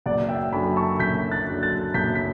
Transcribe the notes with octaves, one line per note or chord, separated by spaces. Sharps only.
F#1 D5 F#5
E5 G5
F#2 D3 G5 B5
A5 C#6
F#1 G6 B6
F#6 A6
F#2 D3
F#6 A6
F#1 G6 B6
B6